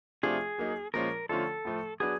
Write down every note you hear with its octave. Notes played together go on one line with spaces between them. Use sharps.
C3 F3 A3 D4 F4 G#4
F#3 A#3 D#4
A#2 F3 G#3 C#4 F4 A#4
D3 F3 A3 C#4 F4 A4
A2 F3 A3
F#3 B3 D4 G#4